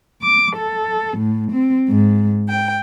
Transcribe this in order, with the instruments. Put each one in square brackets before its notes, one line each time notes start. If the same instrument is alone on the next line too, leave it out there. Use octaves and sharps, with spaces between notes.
[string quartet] D6
A4
A2
C4
G#2
G5